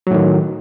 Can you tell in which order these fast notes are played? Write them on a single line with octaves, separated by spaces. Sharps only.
F#3 A2 D#3